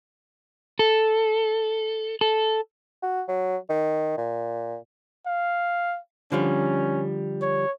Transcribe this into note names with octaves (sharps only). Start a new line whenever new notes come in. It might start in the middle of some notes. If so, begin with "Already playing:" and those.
A4
A4
F#4
F#3
D#3
A#2
F5
D3 F3 G3 C#4
C#5